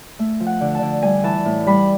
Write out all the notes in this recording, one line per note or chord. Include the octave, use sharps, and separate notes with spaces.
A3
F3
F#5
D3
A5
D3
G3 G#5
E3 A5
A2
G3 B5